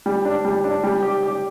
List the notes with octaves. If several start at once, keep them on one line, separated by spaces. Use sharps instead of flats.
G3
D4
G3
D4
G3
G4
G4